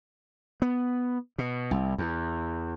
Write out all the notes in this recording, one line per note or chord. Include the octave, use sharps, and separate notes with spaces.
B3
B2
C2
E2